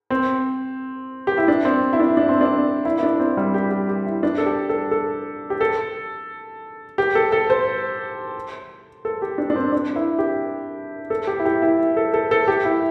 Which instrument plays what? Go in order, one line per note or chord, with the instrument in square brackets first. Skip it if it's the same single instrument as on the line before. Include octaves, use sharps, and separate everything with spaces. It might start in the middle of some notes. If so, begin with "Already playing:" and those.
[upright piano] C4
G4
E4
D4
C4
E4
D4
D4
C4
D4
E4
E4
D4
C4
G3
G4
G4
G4
E4
D4
A4
G4
A4
A4
G4
A4
G4
A4
A4
C5
A4
G4
D4
D4
C4
D4
E4
G4
A4
G4
E4
G4
E4
A4
A4
A4
G4
E4